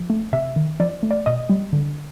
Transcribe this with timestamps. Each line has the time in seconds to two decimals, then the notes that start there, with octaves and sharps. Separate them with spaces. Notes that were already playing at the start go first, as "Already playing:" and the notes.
Already playing: F3
0.10 A3
0.33 C3 E5
0.56 D#3
0.80 F3 D5
1.03 A3
1.11 D5
1.26 B2 D#5
1.49 G3
1.73 D3